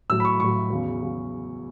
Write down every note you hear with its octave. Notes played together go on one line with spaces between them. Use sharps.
A2 F#3 E6
B5
C#6
A2 F#3 C#6
E2 C#3 F#3
C#3 F#3